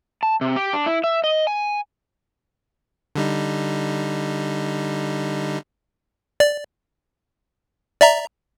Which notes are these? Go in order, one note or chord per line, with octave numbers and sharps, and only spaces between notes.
A5
C3
G4
D4
E4
E5
D#5
G#5
D3 G3 D#4
D5
D5 E5 A#5